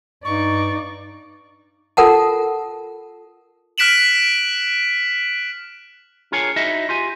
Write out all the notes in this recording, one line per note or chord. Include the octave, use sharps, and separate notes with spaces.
G2 D#4 D5 C#6
F4 A4 A#4 F#5 A5
F6 F#6 B6 D7 E7 F#7
D4 F4 G#4 A#4 C#5 G#5
D#4 E4 F#4 D#5 E5
F4 G4 G#5